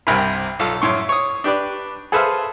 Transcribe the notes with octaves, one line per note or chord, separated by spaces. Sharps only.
C2 G2 C3 A#4 G#5 B5
B1 F4 A4
F#2 A2 C6 C#6
C#5 D#6
D4 G4 B4 D5
G#4 A4 B4 C5 E5 F5